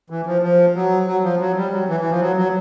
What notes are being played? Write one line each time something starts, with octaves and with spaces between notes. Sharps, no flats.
E3
F3
F3
F#3
F#3
F3
F#3
G3
F#3
E3
E3
F3
F#3
F#3